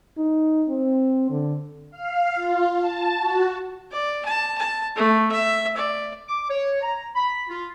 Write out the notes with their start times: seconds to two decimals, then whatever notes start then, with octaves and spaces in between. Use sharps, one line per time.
0.18 D#4
0.69 C4
1.30 D3
1.91 F5
2.35 F4
2.78 A5
3.16 F#4
3.91 D5
4.25 A5
4.57 A5
4.96 A3
5.31 E5
5.76 D5
6.29 D6
6.50 C#5
6.82 A#5
7.15 B5
7.49 F4